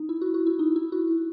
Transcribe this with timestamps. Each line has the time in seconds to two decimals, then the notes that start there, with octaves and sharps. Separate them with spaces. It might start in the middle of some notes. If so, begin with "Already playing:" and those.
Already playing: D#4
0.09 E4
0.21 F#4
0.34 F#4
0.47 E4
0.59 D#4
0.76 E4
0.92 F#4